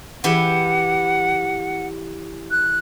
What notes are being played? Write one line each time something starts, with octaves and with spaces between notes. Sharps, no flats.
E3 E4 G4 F#5
F#6